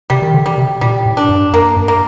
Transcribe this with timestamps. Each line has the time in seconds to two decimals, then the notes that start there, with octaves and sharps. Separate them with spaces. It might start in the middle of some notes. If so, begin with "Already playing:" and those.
0.10 C3 G3
0.22 D#3
0.34 D3
0.46 G3
0.58 C3
0.81 A#2 G3
1.06 A2
1.17 D4
1.29 G2
1.53 F#2 A#3
1.77 G2
1.88 A#3